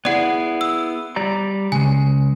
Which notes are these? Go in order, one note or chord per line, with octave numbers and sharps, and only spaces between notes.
B3 E4 G#4 D5 F#5
E6
G3 D5 A#5
C#3 G#3 G#5